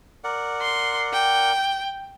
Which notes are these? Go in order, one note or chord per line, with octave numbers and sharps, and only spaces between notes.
A#4 D5 F#5
C6
G5